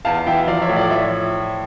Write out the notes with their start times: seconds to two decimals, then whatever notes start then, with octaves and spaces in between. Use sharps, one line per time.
0.05 E2 F5 A5
0.26 E3 E5 G5
0.48 F3 D5 F5
0.62 C#5 E5
0.69 A2
0.76 D5
0.91 F3 C#5 E5